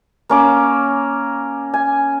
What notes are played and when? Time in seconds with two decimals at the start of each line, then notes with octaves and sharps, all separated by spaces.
0.29 A#3 C#4 D6
1.74 G#5